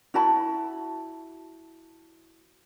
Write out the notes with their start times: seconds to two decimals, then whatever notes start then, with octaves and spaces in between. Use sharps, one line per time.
0.14 E4 F#4 A5 B5